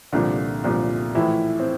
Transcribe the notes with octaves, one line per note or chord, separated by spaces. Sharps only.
C2 A#2 D3 F3 D4
C2 A#2 F3
A2 E3 F3 E4
C4